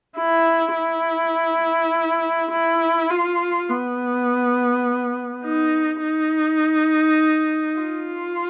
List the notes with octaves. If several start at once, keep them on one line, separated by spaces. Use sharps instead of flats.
E4
E4
E4
F4
B3
D#4
D#4
F4